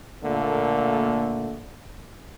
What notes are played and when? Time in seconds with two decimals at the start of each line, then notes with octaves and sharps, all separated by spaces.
0.24 A#2 D3 A3 A#3